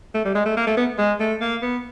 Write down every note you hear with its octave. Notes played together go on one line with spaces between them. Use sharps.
A3
G3
G#3
A3
A#3
A3
B3
G#3
A3
A#3
B3